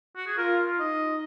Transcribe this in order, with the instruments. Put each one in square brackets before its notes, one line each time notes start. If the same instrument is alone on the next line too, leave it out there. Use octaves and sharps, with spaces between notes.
[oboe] F#4
G#4
[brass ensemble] F4 [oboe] A#4
[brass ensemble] D#4 [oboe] D#5